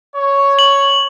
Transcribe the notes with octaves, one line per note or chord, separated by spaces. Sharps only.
C#5
F#7